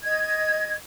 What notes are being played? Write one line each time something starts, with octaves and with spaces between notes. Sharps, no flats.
D#5 G#6